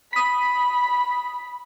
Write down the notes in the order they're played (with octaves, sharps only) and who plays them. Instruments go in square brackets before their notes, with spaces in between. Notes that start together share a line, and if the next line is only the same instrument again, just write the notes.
[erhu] B5 [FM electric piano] D#6 B6